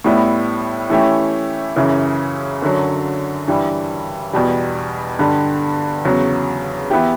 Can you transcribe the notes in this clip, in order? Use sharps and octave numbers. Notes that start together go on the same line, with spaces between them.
A2 G3 B3 E4
E3 A3 C#4 E4 G4
F#2 C#3 E3
F#2 D3 F#3
G2 E3 G3
E2 B2 G3
G2 D3 G3
E2 C#3 F#3
E3 B3 E4 G4